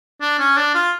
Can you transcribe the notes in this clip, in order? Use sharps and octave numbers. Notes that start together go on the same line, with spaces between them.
D4
C#4
D4
F4